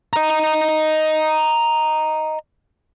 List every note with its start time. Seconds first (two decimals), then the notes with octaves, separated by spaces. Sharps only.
0.13 D#5 A#5